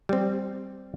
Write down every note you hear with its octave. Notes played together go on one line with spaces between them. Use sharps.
G3 C4